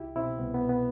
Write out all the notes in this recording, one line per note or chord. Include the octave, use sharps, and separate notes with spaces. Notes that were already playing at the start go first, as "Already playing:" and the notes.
Already playing: C2 E4 G4
B2 C4 E4
C2 B3
B3
B2
B3